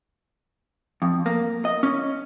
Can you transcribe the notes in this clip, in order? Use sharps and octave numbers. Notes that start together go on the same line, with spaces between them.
F2
A#3
D#5
C#4